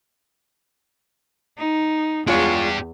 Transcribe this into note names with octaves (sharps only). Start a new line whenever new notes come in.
D#4
E2 G#3 D4 F4 G4 C#5